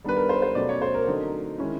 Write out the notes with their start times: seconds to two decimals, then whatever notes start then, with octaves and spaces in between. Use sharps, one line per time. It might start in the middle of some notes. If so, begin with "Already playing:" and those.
0.04 D#3 G3 B3 D4 B4
0.16 A#4
0.29 C5
0.42 C5
0.55 B2 F#3 A3 C#4 D5
0.69 C#5
0.82 C5
0.94 A#4
1.07 D3 F#3 A3 C4 D#4
1.59 D#3 G#3 C#4 E4